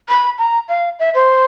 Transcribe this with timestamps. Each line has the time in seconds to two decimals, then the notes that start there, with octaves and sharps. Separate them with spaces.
0.09 B5
0.38 A#5
0.69 F5
0.99 E5
1.15 C5